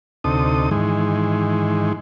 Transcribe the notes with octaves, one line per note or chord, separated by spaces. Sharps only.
D2 C3 D#4 A4 D#6
G#2 D#3 E3 G#3